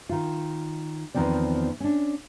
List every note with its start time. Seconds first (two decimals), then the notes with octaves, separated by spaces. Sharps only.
0.09 D#3 F4
1.14 E2 A#2 D#3 F3 C4 D5
1.80 C#4 D4